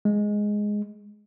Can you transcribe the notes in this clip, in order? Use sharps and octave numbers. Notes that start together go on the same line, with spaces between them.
G#3